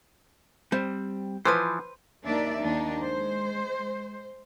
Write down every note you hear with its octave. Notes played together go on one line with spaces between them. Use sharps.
G3 C4
E3 F3 B4 C5
D#2 A#3 D4 D#4 D5 E5
D#2 D4 D#4
G#3 C5